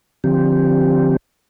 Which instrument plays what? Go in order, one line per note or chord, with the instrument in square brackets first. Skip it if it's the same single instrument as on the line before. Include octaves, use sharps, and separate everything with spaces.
[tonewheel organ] D3 F3 C4 G4